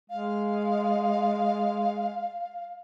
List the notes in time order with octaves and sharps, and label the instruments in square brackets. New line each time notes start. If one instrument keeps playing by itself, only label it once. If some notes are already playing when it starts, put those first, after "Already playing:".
[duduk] G#3 [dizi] F5